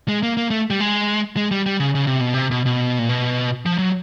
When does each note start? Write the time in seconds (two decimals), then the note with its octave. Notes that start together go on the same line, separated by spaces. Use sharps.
0.09 G#3
0.23 A#3
0.37 A#3
0.50 A3
0.70 G3
0.80 G#3
1.37 G#3
1.51 G3
1.66 G3
1.80 C#3
1.95 C#3
2.07 C3
2.20 B2
2.34 C3
2.51 B2
2.66 B2
2.99 A#2
3.09 B2
3.66 F3
3.78 F#3